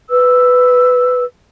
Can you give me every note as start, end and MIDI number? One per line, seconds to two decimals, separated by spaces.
0.09 1.24 71
0.09 1.24 88